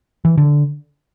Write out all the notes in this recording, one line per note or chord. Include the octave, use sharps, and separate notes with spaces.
E3
D3